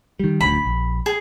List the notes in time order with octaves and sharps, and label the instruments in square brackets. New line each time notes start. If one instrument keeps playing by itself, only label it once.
[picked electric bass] D#3 G3
[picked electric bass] D1 D2 [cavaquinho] B5
[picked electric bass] A#1
[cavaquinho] G#4